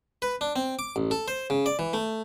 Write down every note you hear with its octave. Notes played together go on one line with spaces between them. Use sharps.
B4
D4
C4
D6
A1
A4
C5
C#3
D5
E3
A3